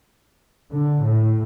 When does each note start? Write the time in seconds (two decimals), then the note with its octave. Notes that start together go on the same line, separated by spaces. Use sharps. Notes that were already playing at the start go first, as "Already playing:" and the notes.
0.71 D3
1.00 A2